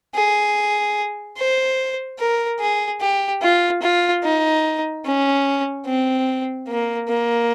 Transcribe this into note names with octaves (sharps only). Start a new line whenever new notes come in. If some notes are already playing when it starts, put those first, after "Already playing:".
G#4
C5
A#4
G#4
G4
F4
F4
D#4
C#4
C4
A#3
A#3